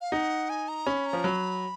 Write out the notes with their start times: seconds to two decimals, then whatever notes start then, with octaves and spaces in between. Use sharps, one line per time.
0.01 F5
0.12 D#4 F#5
0.49 G#5
0.68 A#5
0.86 C#4 B5
1.06 A#5
1.13 F3
1.24 F#3 B5